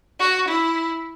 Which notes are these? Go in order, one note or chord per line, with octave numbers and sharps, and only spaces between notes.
F#4
E4